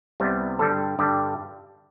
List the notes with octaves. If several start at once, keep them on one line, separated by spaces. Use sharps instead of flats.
C2 C3 G3 B3
G2 D3 G3 A4
G2 D3 G3 G4